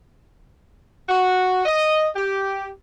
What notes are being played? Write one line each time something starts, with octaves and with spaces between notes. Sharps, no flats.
F#4
D#5
G4